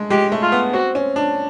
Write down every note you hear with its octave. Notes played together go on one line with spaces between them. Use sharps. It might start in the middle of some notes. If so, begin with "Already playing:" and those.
Already playing: G#3 A3
G#3 G4
A3
F4
B3
C4 F#4
C#4
D4